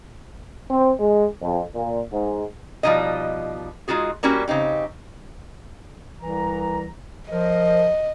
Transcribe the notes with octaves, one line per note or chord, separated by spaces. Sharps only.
C4
G#3
F2
A#2
G#2
B2 F3 G3 G#3 D#4 D#5
G#3 D#4 F4 F#4 G#4
G3 A#3 C#4 E4 F#4 G4
C#3 C4 D#4 G4
C2 E3 A#5
F3 A#4 C5 D#5